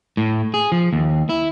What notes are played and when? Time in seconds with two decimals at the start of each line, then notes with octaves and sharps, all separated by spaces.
0.17 A2
0.54 G#4
0.72 F3
0.93 D#2
1.29 E4